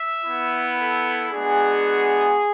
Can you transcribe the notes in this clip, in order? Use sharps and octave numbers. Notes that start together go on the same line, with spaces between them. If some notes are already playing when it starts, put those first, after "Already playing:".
Already playing: E5
B3 E4
A4
G#3 B3 D4 F#4 G#4